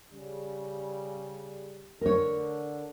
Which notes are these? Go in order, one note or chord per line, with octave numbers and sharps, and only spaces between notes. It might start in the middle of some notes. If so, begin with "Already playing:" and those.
C#3 G3
D3 A#4 C#5